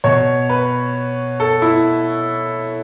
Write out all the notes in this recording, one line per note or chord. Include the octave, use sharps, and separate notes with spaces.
B2 C#5
B4
A4
E4